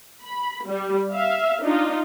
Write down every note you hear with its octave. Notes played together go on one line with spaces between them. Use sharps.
B5
G3
E5 F5
D4 D#4 F4